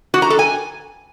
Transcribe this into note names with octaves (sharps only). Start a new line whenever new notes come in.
F#4
A#5
A4
G#5